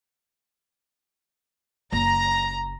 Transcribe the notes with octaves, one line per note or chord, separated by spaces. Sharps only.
F#1 A#5